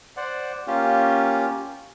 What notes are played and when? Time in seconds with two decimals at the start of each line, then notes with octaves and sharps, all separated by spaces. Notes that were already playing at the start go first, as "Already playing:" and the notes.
0.17 C5 D5 F#5
0.67 A#3 C#4 F4 G4